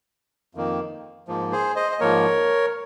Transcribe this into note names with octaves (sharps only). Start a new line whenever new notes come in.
F2 D#3 A#3
G#2 F3 A#3
G#4 C5
C5 D#5
D#5
G#2 F3 A#3 A#4 C#5